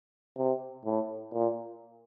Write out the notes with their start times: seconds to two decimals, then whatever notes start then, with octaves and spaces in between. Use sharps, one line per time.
0.38 C3
0.85 A2
1.33 A#2